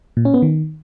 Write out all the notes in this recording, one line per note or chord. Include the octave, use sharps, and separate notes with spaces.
A#2
C#4
B3
D#3